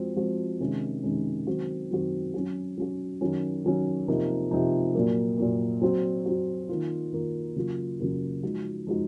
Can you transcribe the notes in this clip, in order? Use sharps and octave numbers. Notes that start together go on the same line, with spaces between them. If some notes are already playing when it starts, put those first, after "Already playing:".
Already playing: F3 G#3 C4 F#4
F3 G#3 C4 F#4
C3 D#3 G#3 C#4
C3 D#3 G#3 C#4
D#3 F#3 C4 F#4
D#3 F#3 C4 F#4
F#3 C#4 F#4
F#3 C#4 F#4
D#3 F#3 C#4
D#3 F#3 C#4
C3 F3 A#3 D#4
C3 F3 A#3 D#4
A#2 F#3 A#3
A#2 F#3 A#3
F#3 C4 F#4
F#3 C4 F#4
D#3 A#3 F4
D#3 A#3 F4
C#3 F#3 A#3 F4
C#3 F#3 A#3 F4
F3 G#3 D#4 F#4
F3 G#3 D#4 F#4